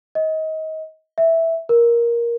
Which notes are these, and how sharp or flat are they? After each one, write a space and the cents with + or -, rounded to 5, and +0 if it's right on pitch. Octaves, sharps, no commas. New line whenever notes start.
D#5 +25
E5 -5
A#4 +10